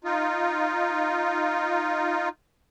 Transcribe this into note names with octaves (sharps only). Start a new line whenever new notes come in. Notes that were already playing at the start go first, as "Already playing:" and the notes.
D#4 F4